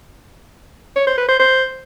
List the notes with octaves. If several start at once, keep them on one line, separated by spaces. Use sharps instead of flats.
C#5
C5
B4
C5
C5